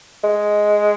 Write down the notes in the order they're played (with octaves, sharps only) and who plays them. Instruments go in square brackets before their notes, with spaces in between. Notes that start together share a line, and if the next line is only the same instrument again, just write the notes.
[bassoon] G#3